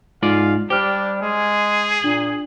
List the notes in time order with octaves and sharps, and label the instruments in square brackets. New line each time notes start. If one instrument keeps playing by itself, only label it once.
[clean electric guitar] G#2 F4 D5 [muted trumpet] F5
[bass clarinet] G3 [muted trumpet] D4 [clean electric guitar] G4 [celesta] C5 F6
[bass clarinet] G#3 [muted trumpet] G#4
[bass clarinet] A#2 [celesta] D4 F#7